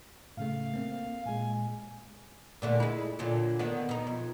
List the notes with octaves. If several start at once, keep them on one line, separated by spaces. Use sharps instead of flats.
A2 C#3 A3 F5
A#3 C4
A#2 G#3 G#5
A#2 D3 A3
G#3 E4
A#2 D3 F#3
D3 D#3 B3
B2 D#4
F2